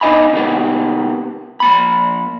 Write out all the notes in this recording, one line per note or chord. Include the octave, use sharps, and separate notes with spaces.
E2 D4 D#4 D#5 G#5 B5
C3 D#3 F#3 G3 A#3 B3
F3 A#3 B5